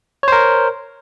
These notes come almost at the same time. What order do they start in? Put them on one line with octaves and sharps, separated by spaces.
C#5 C5 A#4